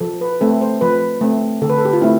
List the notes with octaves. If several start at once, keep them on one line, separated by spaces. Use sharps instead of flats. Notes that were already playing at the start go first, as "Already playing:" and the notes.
F3 A4
B4
A3 C4 A4
C5
F3 B4
A3 C4
D3 A4
B4
A4
G4
F4
A3 C4 E4